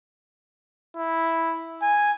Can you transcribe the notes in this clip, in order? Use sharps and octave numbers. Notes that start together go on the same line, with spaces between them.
E4
G#5